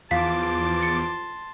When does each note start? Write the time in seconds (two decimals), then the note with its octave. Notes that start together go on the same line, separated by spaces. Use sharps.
0.11 E2 F3 F5 A5 C6 D6 B6
0.80 A6 C#7